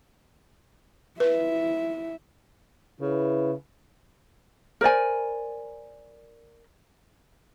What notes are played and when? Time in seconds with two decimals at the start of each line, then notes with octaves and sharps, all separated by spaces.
1.20 E4 B4 E5
3.01 C#3 E4 B4
4.81 A#4 C5 D5 G#5